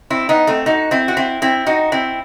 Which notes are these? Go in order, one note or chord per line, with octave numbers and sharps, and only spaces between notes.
C4 E4
B3 D#4
A3 C4
D#4 F#4
C4 E4
F#4
C4 E4
C4 E4
D#4 F#4
C4 E4